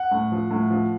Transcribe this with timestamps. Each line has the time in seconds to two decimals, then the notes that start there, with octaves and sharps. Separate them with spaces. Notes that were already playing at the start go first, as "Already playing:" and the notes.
Already playing: F#5
0.11 A2
0.32 F3
0.51 A2
0.70 F3